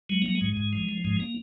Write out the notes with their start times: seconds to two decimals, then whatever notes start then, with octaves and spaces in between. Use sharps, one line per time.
0.09 F#3 G#3
0.22 F#3 A#3
0.35 G#3
0.41 G#2
0.57 G#2
0.73 F3
0.89 F3
1.04 G#2 G#3
1.20 A#3